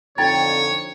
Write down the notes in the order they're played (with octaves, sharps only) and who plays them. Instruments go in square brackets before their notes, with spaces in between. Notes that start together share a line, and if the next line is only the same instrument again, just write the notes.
[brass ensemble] F2 D3 [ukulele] D#4 G5 A#5 [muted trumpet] C#5 [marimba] A6